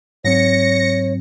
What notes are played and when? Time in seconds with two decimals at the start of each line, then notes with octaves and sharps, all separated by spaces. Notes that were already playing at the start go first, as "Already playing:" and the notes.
0.25 G#2 F#3 C4 C#5 A#6 C#7